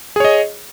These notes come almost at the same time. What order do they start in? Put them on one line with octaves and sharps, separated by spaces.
G#4 C#5 D#5